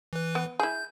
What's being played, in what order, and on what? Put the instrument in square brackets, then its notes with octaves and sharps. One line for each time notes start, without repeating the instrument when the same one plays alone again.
[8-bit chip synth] E3 B4
[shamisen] B3
[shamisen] E4 G#4 [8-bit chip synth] G6